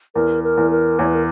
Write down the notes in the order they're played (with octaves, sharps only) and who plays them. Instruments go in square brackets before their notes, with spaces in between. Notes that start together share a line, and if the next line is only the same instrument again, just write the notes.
[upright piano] E2 [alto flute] A#4
[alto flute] A#4
[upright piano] E2
[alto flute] A#4
[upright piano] E2 [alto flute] C#5
[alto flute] B4
A#4